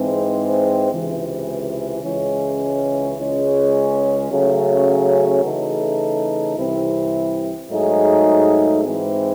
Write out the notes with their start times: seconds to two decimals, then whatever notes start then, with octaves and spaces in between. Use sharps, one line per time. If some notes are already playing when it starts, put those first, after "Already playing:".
Already playing: G#2 E3 G#3 C4
0.91 C#2 C3 E3
2.03 C#2 C#3 E3 G#3 C#4
3.16 C#2 C#3 G#3 C#4
4.30 C#3 F#3 A3 C#4
5.43 C#3 E3 A3 D#4 A4
6.57 C2 C3 E3 C4 E4
7.69 G#2 F#3 A3 D#4 G#4
8.83 G#2 E3 C4